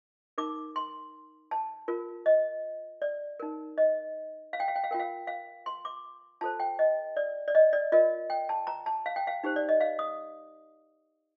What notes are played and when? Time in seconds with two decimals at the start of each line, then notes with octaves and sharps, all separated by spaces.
0.38 D#4 A#4 D6
0.76 C6
1.51 A5
1.88 F4 A#4
2.26 D#5
3.02 D5
3.40 D#4 A#4
3.78 D#5
4.53 F5
4.60 G5
4.68 F5
4.76 G5
4.84 F5
4.91 F4 A#4 G5
5.00 F5
5.27 F5
5.66 C6
5.85 D6
6.41 F4 A4 C5 A5
6.60 G5
6.79 D#5
7.17 D5
7.48 D5
7.55 D#5
7.73 D5
7.92 F4 A#4 D#5
8.30 G5
8.49 A5
8.67 A#5
8.86 A5
9.06 F5
9.16 G5
9.27 F5
9.43 D#4 G4 C5
9.56 D5
9.69 D#5
9.81 F5
9.99 D#6